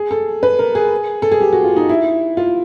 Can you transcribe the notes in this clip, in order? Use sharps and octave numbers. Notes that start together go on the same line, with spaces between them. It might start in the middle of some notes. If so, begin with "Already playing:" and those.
Already playing: G#4
A4
B4
A#4
G#4
A4
G#4
G4
F#4
F4
D#4
E4
F4